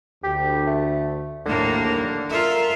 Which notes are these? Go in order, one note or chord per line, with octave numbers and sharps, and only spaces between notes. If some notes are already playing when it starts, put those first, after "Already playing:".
D2 G4
A3
A#1 D#2 A2 D3 A#3
F4 A4 A#4 E5 A#5